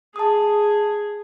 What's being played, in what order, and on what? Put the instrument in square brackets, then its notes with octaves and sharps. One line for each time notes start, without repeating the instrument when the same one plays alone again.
[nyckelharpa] G#4 [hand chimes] A5 D#6